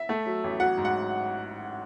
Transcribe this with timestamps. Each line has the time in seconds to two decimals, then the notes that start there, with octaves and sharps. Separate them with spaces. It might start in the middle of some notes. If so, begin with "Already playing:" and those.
Already playing: E5
0.09 A3
0.26 F#3
0.44 A1
0.60 F#3 F#5
0.78 G#2
0.85 F#5